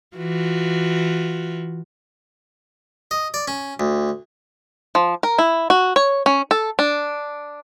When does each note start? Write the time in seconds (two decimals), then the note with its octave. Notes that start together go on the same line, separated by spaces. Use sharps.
0.17 E3 F4 F#4
3.11 D#5
3.34 D5
3.48 C#4
3.80 D2
4.95 F3
5.23 A#4
5.38 E4
5.70 F#4
5.96 C#5
6.26 C#4
6.51 A4
6.79 D4